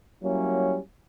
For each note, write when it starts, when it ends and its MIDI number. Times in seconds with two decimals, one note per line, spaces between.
0.23 0.77 54
0.23 0.77 55
0.23 0.77 58
0.23 0.77 61
0.23 0.77 64